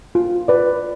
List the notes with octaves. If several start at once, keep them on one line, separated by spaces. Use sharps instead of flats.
F4
B4 D5